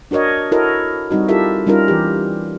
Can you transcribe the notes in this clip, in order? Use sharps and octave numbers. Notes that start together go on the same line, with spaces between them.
D4 F#4 A#4 C#5 D#5
E4 F#4 A4 A#4 C#5 D#5
G3 C4 D#4 F#4
E4 F4 G4 A4 A#4 E5
G3 C#4 D#4 F4 A#4
E3 G4